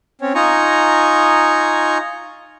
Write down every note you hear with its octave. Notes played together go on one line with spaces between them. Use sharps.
C4 C#4 C#5
D#4 F4 G#5 A#5 C#6